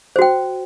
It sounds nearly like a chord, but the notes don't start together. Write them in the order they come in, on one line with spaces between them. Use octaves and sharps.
C5 F#4 G5